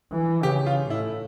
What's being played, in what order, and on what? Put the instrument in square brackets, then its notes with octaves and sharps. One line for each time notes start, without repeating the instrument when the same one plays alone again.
[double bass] E3
[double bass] C#3 [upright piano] G4
[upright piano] F4
[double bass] A2 [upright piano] E4